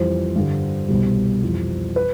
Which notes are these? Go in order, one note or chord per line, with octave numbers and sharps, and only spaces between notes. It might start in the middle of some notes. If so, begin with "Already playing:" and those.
Already playing: F2 E3 G3 C5
G2 D3 G3
C2 B2 G3
F2 E3 G3
B4